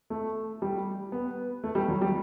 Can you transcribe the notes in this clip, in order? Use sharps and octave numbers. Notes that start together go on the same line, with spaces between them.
A3
G3
B3
A3
G3
F#3
G3